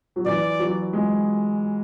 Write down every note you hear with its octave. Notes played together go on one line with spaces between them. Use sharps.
F#3
E3 D5
F#3
G#3